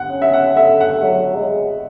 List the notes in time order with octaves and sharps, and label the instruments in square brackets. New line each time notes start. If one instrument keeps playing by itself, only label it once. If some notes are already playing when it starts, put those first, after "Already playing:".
Already playing: [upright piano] F#5
[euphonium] C#4
[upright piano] E5
F#5
[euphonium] A3 [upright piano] E5
[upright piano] F#5
[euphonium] F#3
G#3